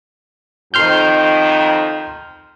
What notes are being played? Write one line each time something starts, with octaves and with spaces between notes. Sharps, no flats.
F2 D#3 C6 F6 G6